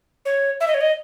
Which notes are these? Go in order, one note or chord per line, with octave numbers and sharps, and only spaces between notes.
C#5
E5
D#5
C#5
D#5